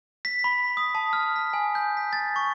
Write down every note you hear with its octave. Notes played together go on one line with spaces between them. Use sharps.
B6
B5
D#6
A5
F6
B6
G#5
G6
B6
A6
C#6